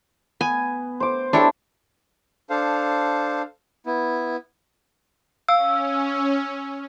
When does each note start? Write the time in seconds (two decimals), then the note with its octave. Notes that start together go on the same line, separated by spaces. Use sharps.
0.41 B3 G#5
1.00 C5 D6
1.33 D4 E4 G4 A4 C#5
2.50 D4 A4 C5 F5
3.86 B3 E4
5.49 C#4 F5 E6